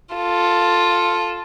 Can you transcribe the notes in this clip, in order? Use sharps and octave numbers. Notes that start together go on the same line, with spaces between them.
F4 A4